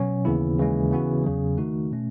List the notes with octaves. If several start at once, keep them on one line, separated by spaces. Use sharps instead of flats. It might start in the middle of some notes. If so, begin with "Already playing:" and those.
Already playing: B2 F#3 C#4
D#2 C#3 E3 B3 E4
D#2 C#3 E3 G#3 C#4
C#3 E3 B3 F#4
E2 C#3 F#3
D#3 A3 D#4 F#4
B2 A3 C#4